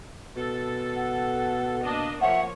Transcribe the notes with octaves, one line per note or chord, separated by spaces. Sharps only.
B2 A4
F#5
A#3 D4 D#5
F3 A#3 C#5 E5 F#5